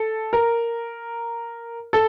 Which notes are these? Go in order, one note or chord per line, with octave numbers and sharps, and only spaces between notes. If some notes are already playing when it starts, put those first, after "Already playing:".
Already playing: A4
A#4
A4